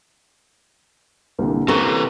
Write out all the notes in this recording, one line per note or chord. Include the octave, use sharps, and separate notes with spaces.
C2 A#2 D3
C3 E3 C#4 A4 A#4 C#6